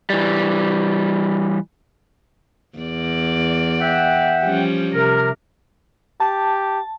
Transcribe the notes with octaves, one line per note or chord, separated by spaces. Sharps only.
E3 G3
E2 D5
E5 F#5 G5
F3 G3 C#4
C3 A#4
G4 A5